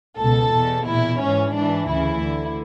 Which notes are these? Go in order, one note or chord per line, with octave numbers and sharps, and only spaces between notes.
C#2 B2 A4
E2 B2
E2 B2 E4
G#2 E3 C#4
G#2 E3 D4
D2 C#3 E3 E4
D2 D3